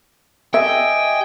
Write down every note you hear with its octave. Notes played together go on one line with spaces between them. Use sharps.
G4 D#5 E5 G5 G#5